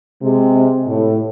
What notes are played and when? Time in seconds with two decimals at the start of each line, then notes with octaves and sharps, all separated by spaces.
0.22 C3 G#3
0.87 A2